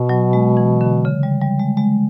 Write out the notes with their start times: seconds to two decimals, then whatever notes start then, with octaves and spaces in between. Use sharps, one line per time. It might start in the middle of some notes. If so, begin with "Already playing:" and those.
Already playing: B2
0.09 F#3
0.33 G#3
0.57 E3
0.81 D3
1.05 C#3
1.23 G3
1.41 G3
1.59 G#3
1.77 G#3